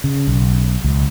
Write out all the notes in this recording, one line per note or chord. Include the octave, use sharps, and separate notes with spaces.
C#3
B1
C#2